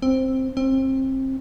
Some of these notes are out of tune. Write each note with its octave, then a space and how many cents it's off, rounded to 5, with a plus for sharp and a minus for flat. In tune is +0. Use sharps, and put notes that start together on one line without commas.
C4 +5
C4 +25